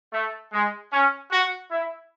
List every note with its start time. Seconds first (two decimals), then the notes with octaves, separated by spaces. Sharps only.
0.12 A3
0.52 G#3
0.92 C#4
1.31 F#4
1.70 E4